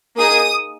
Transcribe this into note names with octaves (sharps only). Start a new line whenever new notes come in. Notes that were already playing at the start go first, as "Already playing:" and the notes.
A#3 D#4 G#4 D#6